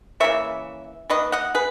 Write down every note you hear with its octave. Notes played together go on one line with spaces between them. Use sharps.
C#3 E3 A#3 C#5 E5
D#3 A#3 B4 D#5
D#5 F#5
G#4 B4